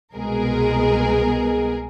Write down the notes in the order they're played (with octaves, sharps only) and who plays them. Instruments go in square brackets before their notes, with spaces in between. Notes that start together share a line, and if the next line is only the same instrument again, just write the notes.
[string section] C2 B2 G#3 B3 G#4 A#4